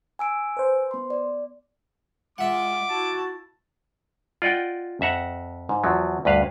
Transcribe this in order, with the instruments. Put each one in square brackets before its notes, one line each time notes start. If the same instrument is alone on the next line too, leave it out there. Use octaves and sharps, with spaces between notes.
[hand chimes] G#5 E6 D7
[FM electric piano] B4 C5
[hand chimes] B3 C6
D5
[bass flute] G#3 [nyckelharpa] F4 [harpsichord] E5 F#5 [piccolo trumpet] D6
[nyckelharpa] E4 A5 [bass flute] F#4
[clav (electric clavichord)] F4 D5 D#5 F#5 G5
F2 E5 F#5 A#5
G#2
E2 F3 F#3
D2 G2 B4 F5